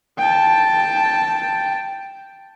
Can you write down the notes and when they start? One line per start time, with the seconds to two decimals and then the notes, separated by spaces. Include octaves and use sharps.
0.18 G5 A5